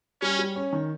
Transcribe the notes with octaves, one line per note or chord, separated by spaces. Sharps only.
G3 C#4
G3
C#4
D#3